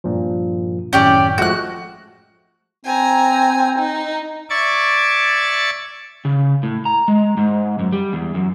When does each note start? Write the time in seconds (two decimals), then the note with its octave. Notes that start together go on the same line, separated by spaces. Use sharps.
0.04 G2 A#2 F3
0.93 G#1 F#2 A2 C#4 G4 D5
1.38 F3 G#3 A3 F#4 F#6
2.85 C4 G#5 A#5
3.78 D#4
4.50 D5 E5 C#6 D6 G#6 A6
6.25 C#3
6.63 A2
6.85 A#5
7.08 G#3
7.37 G#2
7.79 F#2
7.92 G3
8.13 E2
8.34 F#2